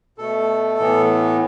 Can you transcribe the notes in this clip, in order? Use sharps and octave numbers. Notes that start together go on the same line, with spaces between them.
B2 A3 A4
A2 E3 B3